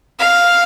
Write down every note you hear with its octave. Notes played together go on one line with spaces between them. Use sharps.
F5